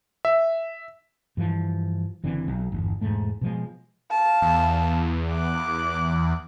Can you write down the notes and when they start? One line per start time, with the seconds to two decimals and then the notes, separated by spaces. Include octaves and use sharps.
0.25 E5
1.37 G2 E3 F3
2.24 F#1 D3 E3 C4
2.48 B1
2.72 G1 E2
3.01 E1 G#2 A3
3.41 B2 F3 G#3
4.11 F5 A5
4.42 E2
5.32 D6 F#6